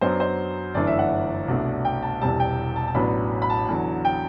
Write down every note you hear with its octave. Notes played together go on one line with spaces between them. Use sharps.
F#2 F#3 B3 D4 C5
C5
G1 F#2 E3 A3 D4 D5
E5
F#5
C2 B2 A3 D4
G5
A5
E1 E2 C3 G3 A5
G5
A5
A5
A1 A2 F#3 B3 D4 B5
B5
A5
E2 D3 F#3
G5